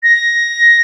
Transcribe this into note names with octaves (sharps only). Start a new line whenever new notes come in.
A#6